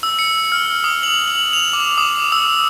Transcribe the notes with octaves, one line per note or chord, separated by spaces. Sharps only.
E6
C#7
F6
D#6
F#7
F#7
F7
D6
D#6
E6